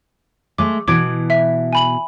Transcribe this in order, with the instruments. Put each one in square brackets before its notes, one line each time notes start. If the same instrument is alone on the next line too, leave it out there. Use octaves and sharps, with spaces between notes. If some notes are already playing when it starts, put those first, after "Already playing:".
[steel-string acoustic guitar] G#3 A3 [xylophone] D6
[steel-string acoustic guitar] B2 E3 [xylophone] D6 G#6 D7
[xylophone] E5 B6
G#5 B5 F#7